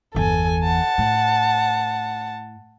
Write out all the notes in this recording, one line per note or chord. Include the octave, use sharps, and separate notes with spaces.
G1 E2 A4 G#5
F#5 A5
A2